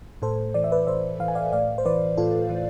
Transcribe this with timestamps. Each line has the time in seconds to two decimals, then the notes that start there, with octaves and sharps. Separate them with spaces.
0.22 A2 A4 C5
0.54 E3 D5
0.64 E5
0.72 B4 D5
0.87 A2 C5 E5
1.20 E3 F5
1.28 G#5
1.35 D5 F5
1.53 A2 D5 F5
1.78 C5
1.85 E3 B4 D5
2.17 A2 F4 A4
2.50 E3